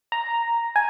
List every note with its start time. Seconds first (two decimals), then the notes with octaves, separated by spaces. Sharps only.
0.12 A#5
0.76 G#5